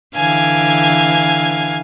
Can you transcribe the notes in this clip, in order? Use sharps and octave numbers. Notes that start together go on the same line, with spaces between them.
D3 E3 F5 G#5 G#6